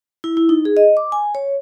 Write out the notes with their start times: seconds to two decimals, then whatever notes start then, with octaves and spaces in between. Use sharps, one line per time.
0.24 E4
0.37 E4
0.49 D#4
0.65 G#4
0.77 D#5
0.97 D6
1.12 G#5
1.35 C#5